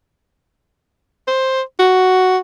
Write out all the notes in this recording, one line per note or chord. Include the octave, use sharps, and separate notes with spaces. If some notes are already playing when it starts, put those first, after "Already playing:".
C5
F#4